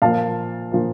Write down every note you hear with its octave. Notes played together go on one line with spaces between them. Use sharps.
A#2 F3 A#3 F5 A5
A#2 F3 A#3